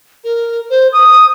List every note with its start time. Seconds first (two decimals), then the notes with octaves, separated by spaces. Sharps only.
0.24 A#4
0.70 C5
0.92 D#6